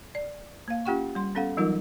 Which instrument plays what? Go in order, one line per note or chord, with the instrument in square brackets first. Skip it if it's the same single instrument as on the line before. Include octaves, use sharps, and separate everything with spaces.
[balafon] D5
A#3 F5
C#4 F4 G4 F#5 G5 C#6
G3 C6
B3 C#4 A4 F5 F#5
E3 F#3 G3 D#4 F4 A#4